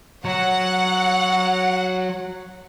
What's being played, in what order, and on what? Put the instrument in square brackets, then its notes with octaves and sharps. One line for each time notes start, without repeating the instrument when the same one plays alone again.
[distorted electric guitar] F#3 [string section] F#5